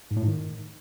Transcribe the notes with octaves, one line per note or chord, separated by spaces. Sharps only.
G#2
A2
G#2
D#3